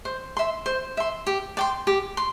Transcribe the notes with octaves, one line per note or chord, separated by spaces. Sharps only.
C5
E5 C6
C5
E5 C6
G4
D5 G5 C6
G4
C6